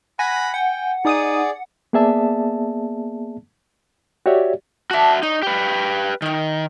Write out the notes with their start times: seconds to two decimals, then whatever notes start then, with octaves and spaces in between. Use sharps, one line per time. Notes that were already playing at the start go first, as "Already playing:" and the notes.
0.19 F#5 G#5 B5 A#6
0.54 F#5 G5
1.05 D#4 G#4 D5 D#6 D#7
1.93 A#3 B3 G#4 D5 E5 A5
4.26 F#4 G4 C#5 D5 E5
4.91 F#4 E5 A5 D6
5.23 D#4 G#4 C#5 D5
5.43 G4 B4
6.22 D#3 E4 F6